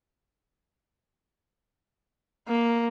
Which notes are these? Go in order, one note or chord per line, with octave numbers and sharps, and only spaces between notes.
A#3